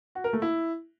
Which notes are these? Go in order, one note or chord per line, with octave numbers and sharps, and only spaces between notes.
F#4
A#4
A3
E4